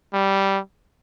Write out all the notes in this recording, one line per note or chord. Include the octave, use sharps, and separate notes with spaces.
G3